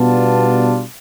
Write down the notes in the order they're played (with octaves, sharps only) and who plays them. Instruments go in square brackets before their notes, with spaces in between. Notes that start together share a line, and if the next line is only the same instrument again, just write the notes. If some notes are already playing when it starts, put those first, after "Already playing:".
Already playing: [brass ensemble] B2 G3 B3 D4 F4 A5